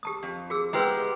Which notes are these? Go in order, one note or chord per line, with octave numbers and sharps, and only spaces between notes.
G4 A5 D#6
F2
F#4 G#4 E6
G#3 B3 E4 G4 B4 E6